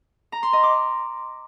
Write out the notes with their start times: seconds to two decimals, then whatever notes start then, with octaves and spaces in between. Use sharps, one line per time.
0.32 A#5
0.43 C6
0.53 D#5
0.63 D6